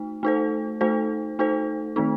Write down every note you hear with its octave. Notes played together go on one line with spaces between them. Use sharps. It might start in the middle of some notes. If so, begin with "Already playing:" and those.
Already playing: A3 D#4
A3 D#4 A4 C5
A3 D#4 A4 C5
A3 D#4 A4 C5
D#3 A3 C4 D#4